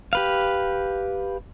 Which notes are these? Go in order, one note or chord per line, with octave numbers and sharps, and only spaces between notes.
G4 B4 F5